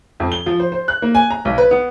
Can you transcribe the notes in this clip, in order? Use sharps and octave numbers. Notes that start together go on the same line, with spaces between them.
F2
G7
F3
C5
C5
F#6
A#3
G#5
A#5
B1
B4
B3